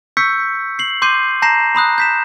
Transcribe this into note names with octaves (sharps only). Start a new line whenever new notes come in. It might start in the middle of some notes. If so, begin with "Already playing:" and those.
C#6 E6 G6 B6 C#7
C7 F#7
C6 D6 G6 C7 D#7
A5 A#5 G6 A#6 C7 E7
A#5 B5 D#6 F#6
G6 B6 E7